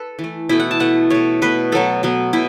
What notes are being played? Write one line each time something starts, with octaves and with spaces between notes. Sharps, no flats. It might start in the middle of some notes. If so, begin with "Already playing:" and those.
Already playing: A4 B4
E3
A3
B2 A3 E4
F#5
A5
B2 A3 F#5
B2 A3 C#5
B2 A3 B4
B2 F#3 B3 A4
B2 F#3 B3
B2 E4